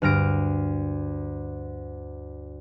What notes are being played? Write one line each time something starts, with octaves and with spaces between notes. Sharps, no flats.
D2 G2 F6 A#6 D7